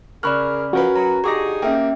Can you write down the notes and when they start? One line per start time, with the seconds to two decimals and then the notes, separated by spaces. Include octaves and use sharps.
0.23 C#3 G#4 A#4 D5 B5 C#6 F6 F#6
0.73 F#2 F3 C#4 F#4 A#4 B4
0.96 F#3 A#5
1.24 D3 D#4 G4 G#4 C#6 D6 A#6
1.62 A#3 C#4 G4 E5 G5